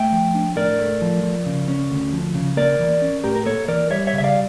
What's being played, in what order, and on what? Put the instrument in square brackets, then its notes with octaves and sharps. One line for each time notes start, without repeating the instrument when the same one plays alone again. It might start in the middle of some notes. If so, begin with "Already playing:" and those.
Already playing: [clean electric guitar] A3 E5 G5
F3
D4
A2 A#4 D5
A3
F3
F3
C#3
C#4
D2
F3
C#3
A#3 A#4 D5
E3
C#4
A2 G4 A#4
A#4
A#3 A4 C#5
E3 A#4 D5
G3 C#5 E5
C#5 E5
C#3
E5
D5 F5